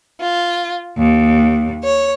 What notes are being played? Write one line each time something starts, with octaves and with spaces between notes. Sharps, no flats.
F4
D#2
C#5